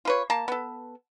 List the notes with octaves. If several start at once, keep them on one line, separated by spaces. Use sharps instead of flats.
F4 B4 C#5
A#3 A5
B3 A4